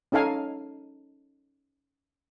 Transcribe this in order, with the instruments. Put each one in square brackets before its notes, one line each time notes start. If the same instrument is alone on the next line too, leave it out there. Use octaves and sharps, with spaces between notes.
[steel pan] C#4 D#4 A4 F5 G#5